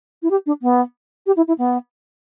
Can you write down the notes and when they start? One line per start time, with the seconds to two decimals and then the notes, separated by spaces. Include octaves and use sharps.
0.22 E4
0.30 G4
0.46 D4
0.62 B3
1.26 G4
1.36 E4
1.48 E4
1.58 B3